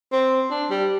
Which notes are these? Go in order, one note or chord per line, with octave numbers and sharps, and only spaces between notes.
C4
D4
G3